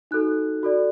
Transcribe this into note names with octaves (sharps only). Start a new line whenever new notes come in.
D#4 F#4 A4 F#6
F#4 A4 D5